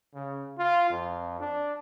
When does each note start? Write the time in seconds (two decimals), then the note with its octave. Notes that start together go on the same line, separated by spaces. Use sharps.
0.14 C#3
0.58 F4
0.90 F2
1.40 D4